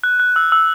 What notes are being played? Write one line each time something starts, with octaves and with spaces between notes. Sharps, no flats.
F#6
F#6
E6
E6